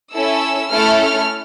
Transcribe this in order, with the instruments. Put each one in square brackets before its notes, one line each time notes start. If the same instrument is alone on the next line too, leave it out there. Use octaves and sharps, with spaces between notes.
[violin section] C#4 E4 A4 E6
A3 C#4 E4 A4 F6
F6